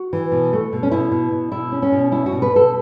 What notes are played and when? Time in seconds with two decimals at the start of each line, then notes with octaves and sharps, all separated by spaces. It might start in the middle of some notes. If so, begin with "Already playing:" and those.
Already playing: F#4
0.13 E3
0.32 B2
0.53 A3
0.73 B2
0.83 C#4
0.92 B2 E4
1.11 B2
1.32 B2
1.52 B2 E4
1.72 C#4
1.82 C#4
1.92 B2
2.11 C#4 E4
2.26 F#4
2.32 B2
2.42 B4
2.52 B2 A4